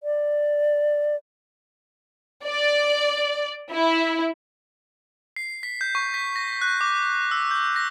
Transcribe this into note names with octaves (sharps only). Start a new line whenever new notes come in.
D5
D5
E4
C7
B6
G6
C#6
B6
A#6
F#6
D6
E6
G6
A#6